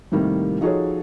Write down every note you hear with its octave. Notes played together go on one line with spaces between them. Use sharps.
A2 C3 D#3 G3 A#3
F3 D#4 F#4 G#4 A4 C#5